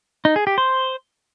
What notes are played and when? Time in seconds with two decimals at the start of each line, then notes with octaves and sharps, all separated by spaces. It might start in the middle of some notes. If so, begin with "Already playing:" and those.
0.25 D#4
0.36 G#4
0.47 G4
0.58 C5